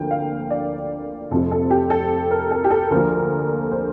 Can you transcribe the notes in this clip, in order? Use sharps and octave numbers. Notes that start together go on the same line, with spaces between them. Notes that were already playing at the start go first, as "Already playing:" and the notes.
Already playing: D2 D3 F3 A#3 G5
F5
D5
F1 F2 C3 F3 A4
A4
G4
A4
A#4
A4
G4
A4
D2 D3 F3 A#3 A#4
C5